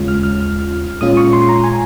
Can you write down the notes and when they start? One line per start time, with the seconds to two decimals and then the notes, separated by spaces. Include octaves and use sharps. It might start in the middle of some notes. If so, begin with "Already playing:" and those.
Already playing: D#2 C#3 G#3 C#4 F4
0.08 F6
0.23 F6
1.01 A#2 G#3 C#4 F4 D#6
1.17 C#6
1.33 C6
1.49 A#5
1.64 G#5